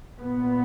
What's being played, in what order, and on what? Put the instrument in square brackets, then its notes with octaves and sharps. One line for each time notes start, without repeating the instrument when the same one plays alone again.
[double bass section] A#2 B3